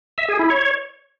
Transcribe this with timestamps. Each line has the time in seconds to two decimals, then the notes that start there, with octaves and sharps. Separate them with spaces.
0.18 E5
0.29 G#4
0.39 E4
0.50 C#5